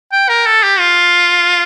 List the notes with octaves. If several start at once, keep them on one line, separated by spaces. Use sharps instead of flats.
G5
A#4
A4
G4
F4